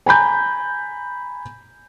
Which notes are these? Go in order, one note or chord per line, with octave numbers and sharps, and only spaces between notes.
G#5 A#5 B5 G6